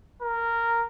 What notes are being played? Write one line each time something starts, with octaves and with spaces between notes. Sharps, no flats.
A#4